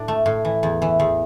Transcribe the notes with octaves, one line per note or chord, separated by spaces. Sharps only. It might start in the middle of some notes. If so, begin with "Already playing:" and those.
Already playing: A2 D4
A3
A2
E3
E2
E3
E2